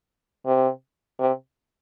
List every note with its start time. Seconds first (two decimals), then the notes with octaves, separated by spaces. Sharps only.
0.46 C3
1.20 C3